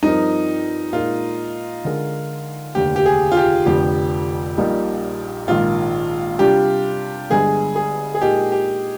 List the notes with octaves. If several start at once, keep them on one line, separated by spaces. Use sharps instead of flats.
G2 F3 C4 D#4 G4 A#4
A#2 G#3 D#4 F4 A#4
D3 G#3 D#4 A#4
F1 D#2 D3 G4
G4
G#4
F4
G4
F1 F2 D3 F3 G4
A#1 A#2 G3 A#3 D#4
A#1 G#2 D#3 F4
C3 G3 D4 F4 G4
G1 G2 D3 G#3 G#4
G#4
G#4
A#2 G#3 D#4 G4 A#4
G4